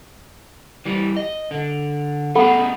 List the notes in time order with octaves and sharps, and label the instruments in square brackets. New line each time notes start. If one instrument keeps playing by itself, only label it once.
[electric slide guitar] E3 G3
D#5
D3
[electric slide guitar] A3 B3 G#4 [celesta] A4 F#5 B5